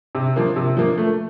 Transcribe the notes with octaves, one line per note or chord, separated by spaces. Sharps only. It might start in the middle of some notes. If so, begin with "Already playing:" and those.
C3
F3 A#3
C3
F3 A#3
A3